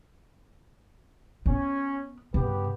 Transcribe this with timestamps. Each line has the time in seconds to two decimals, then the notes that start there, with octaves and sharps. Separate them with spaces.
1.46 B3 C#4
2.34 G2 C#3 B3 G4 B4